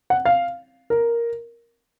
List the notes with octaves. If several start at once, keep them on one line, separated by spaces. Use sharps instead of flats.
F#5
F5
A#4